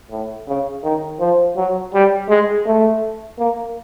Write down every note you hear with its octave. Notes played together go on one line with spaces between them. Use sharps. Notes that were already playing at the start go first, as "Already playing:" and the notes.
A2
C#3
D#3
F3
F#3
G3
G#3
A3
A#3